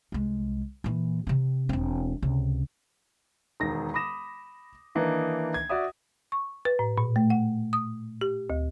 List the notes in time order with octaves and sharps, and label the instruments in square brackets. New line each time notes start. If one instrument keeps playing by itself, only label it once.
[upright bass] C2 G#3
A#2 E3
C3 C4
E1 C4
C#2 C3
[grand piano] E1 D#3 A#6
B5 D6 D#6 A#6 E7
D#3 E3 A#3 D4 D#4
G#6
F#4 D5 E5 D#6
[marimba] C#6
B4
A2
A#2
A3
F#5
D#6
G4
D2